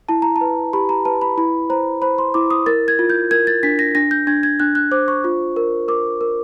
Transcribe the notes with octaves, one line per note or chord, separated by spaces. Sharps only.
E4 A5
A#5
A5
B4
G4 B5
A#5
B4 A5
B5
E4 B5
C5 A#5
C5 B5
C6
E4 D6
D#6
A#4 A6
G#6
F4
G6
A#4 G#6
A6
D4 B6
A#6
D4 A#6
G6
D4 G#6
G#6
D4 F#6
F#6
C5 D6
C#6
F4
A#4
A#4 D6
A#4